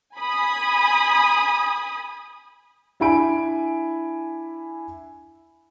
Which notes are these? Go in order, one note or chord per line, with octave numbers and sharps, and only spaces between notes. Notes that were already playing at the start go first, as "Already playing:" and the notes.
G#5 B5 D#6
D4 E4 G#5 B5 D7